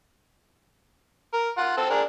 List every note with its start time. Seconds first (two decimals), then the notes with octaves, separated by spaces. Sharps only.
1.33 A#4
1.57 F4 F#5
1.77 C4 A4
1.90 D4 G#4 A#4